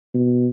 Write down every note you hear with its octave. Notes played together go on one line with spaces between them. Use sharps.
B2